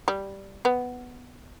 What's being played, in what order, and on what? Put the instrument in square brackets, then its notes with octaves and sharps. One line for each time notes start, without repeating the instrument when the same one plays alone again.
[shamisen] G3
B3